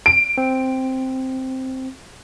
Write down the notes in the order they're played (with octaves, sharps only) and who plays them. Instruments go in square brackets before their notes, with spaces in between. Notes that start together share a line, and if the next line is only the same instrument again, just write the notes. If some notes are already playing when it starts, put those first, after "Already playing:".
[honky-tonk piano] D7
[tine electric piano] C4